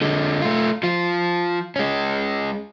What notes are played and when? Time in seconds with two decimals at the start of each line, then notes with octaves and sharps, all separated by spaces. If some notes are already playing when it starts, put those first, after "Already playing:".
0.01 D3 G#3
0.42 A3 F4
0.83 F3 F4
1.76 G#3 C#4